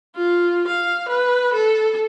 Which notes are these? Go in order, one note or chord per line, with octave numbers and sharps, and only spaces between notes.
F4
F5
B4
A4